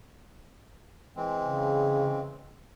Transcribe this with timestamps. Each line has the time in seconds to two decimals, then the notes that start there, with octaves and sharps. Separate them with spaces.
1.16 E3 G#3 C4
1.43 C#3